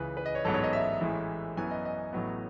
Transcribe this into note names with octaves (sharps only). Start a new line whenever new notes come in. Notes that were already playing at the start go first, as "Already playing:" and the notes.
Already playing: C#2 C#3 E3 B4
B4
D#5
C#5
A1 G#2 F#3 B3 A4
C#5
D#5
E5
A1 A2 E3 G#3
F#2 E3 B3 G#5
D#5
D#5
A1 A2 F#3 B3